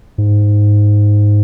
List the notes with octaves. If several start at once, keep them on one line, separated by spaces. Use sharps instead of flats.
G#2